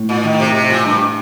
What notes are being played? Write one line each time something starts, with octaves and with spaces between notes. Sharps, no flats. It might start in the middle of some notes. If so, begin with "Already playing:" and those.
Already playing: A2
A#2
D#3
C3
C3
A#2
G2